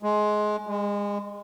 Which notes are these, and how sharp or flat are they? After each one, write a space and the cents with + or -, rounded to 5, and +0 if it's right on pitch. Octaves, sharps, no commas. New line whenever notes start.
G#3 +20
G#3 -30